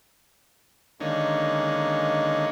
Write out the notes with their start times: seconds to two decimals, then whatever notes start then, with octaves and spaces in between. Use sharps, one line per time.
1.00 D3 D#3 G#3 A#3 C#4